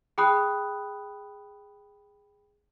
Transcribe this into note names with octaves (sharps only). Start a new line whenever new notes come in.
G#4 G5 B5 D#6 F#6